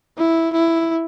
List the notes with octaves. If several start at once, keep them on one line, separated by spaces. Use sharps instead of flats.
E4
E4